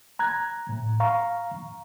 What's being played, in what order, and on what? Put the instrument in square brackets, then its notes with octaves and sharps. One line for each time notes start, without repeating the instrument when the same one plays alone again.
[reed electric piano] A#5 F#6 G#6
A2
F5 A#5 C#6